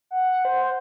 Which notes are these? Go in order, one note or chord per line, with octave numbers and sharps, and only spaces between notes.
F#5
C5